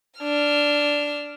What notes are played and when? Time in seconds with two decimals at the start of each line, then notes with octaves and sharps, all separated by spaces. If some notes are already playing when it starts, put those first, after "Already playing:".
0.20 D4 F6